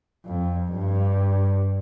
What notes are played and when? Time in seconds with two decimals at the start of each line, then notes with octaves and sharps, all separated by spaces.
0.26 F2
0.71 G2